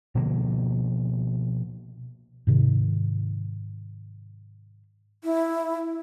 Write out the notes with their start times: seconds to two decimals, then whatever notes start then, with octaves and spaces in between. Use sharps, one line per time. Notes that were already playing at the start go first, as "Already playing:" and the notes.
0.15 B2 D3 F3 A#3
2.47 G#2 C3 D#3
5.23 E4